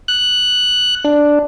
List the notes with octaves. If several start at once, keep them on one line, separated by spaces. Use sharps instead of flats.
F#6
D4